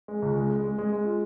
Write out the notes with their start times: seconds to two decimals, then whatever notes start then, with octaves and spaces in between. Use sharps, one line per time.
0.08 G#3
0.22 C#2
0.36 G#3
0.50 G#3
0.64 G#3
0.78 G#3
0.92 G#3
1.05 F4